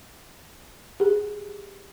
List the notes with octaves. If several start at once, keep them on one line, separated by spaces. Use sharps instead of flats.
G4 G#4